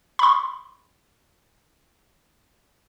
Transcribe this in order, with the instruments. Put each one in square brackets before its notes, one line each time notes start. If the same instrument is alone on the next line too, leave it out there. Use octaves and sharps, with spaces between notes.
[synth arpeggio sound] B5 C6